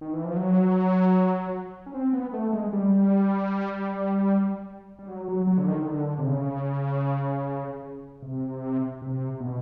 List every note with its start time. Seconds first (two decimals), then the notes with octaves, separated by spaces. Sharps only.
0.01 D#3
0.13 E3
0.25 F3
0.36 F#3
1.86 C#4
1.94 C4
2.13 B3
2.33 A3
2.53 G#3
2.73 G3
4.99 G3
5.08 F#3
5.28 F#3
5.47 F#3
5.58 D3
5.67 D#3
5.82 D#3
5.87 D3
6.19 C3
6.26 C#3
8.22 C3
9.02 C3
9.40 B2